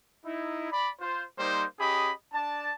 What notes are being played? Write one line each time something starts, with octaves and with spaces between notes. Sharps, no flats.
D#4 E4
D5 B5
F4 C5
G3 A#3 D#4 C5
C#4 G4 G#4 D#5 B5
D4 D5 A5